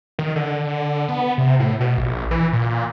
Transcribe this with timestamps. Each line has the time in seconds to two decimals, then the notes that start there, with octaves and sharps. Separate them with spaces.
0.19 D#3
0.36 D3
0.63 D3
1.08 B3
1.38 C3
1.60 A2
1.80 B2
1.98 A#1
2.31 E3
2.53 A#2